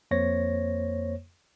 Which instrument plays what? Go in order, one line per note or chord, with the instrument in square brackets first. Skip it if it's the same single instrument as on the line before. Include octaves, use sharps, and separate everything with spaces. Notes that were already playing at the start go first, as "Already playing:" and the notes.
[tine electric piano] F2 A#3 C5 C#5 A#6